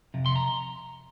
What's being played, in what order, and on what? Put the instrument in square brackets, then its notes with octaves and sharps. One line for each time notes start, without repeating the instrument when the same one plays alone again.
[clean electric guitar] F2 C3
C6
A#5